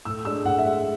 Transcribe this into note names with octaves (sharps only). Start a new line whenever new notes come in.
A2 E6
G#3 D4 E6
A2 F#5
E5
G#3 D4